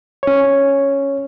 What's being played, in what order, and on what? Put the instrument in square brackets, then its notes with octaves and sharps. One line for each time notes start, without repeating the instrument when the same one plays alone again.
[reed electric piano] C#4 C#5